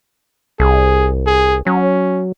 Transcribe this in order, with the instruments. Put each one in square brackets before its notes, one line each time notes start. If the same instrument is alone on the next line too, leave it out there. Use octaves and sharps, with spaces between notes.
[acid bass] C2 [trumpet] G#4
[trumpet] G#4
[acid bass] F#3 [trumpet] C#4